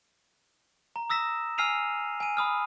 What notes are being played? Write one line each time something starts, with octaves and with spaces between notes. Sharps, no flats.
A#5
D#6 E6 A#6 B6 E7
G#5 E6 F6 C7 D#7 F7
G#5 D#7
B5 D#6 F6